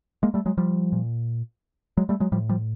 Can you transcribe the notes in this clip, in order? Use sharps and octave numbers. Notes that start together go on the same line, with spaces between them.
G#3 A#3
G3 A3
F#3 G#3
F3 G3
A#2
F#3 G#3
G3 A3
F#3 G#3
A2 F3 G3
F3 G3